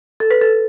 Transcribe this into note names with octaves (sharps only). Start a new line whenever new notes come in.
A4
B4
A4